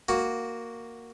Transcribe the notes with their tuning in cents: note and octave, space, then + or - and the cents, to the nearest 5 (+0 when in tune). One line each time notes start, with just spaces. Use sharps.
A#3 +0 F#4 +0